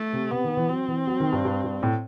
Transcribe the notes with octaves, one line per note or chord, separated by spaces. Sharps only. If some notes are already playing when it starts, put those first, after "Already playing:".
Already playing: A3
C3
C3 B3
D#3
E3
F#3 C4
E3
F#3
D#3
G2
G2
G2
A2